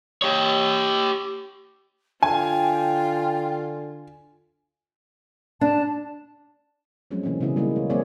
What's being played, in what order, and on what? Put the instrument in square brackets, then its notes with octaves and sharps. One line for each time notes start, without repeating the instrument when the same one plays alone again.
[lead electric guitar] G4 C#5
[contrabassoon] D3 [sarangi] F4 [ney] G5 [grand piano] G#5
[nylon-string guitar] D4 [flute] A5
[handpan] F3 F#3 G#3 A3 C4 C#4
B2 E3 A#3 C4 C#4
C#3 B3 C#4 E4 G#4
G3 G#3 A#3 D#4
E4 C#5
F#3 A#3 C4 G#4 C#5 D5